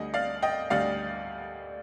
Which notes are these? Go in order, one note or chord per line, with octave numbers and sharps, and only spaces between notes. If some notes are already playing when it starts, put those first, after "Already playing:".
Already playing: D2 D3 G3 D#5
D5 F5
D#5 G5
D2 D3 G3 D5 F5